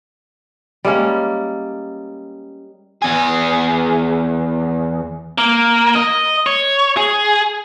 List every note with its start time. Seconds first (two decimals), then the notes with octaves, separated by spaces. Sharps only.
0.85 G3 G#3 A#3 C#4
3.02 E2 G#4
5.38 A#3
5.95 D#5
6.46 C#5
6.97 G#4